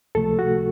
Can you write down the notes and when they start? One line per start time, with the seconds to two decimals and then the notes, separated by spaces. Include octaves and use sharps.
0.15 C#2 C3 F3 A3 A4
0.39 F#4